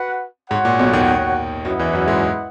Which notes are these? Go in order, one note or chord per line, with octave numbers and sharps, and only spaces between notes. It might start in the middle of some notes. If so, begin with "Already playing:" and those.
Already playing: F#4 B4 F#5
G#2 F#4 C#5 F#5
A#2
B1 B2
D#2 D#3
F#2 F#3 E4 B4 D#5 F#5
E2 E3
F#2 F#3
G#2 G#3